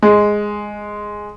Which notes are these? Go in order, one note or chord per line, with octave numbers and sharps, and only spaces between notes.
G#3